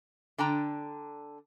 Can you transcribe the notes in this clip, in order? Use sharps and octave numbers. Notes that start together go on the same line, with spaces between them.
D3 D4 G5 A#5